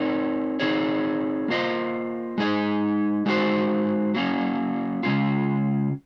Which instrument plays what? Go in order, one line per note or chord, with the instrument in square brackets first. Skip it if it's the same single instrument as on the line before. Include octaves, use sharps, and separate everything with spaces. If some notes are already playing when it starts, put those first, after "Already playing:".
Already playing: [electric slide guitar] C4 D#4 A#4 C#5
C4 D#4 G#4 C#5
A#3 F4 C5 D#5
G#3 D#4 G#4 D#5
G#3 D#4 F#4 C5
F#3 A#3 C#4
C#3 G#3 C#4 F4